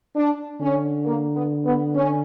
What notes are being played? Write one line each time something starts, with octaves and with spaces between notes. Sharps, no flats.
D4
D3 C#4
A#3
B3
B3
C#4